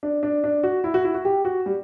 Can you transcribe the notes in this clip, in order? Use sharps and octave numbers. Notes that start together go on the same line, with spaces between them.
D4
D4
D4
F#4
E4
F#4
E4
F#4
G4
F#4
G3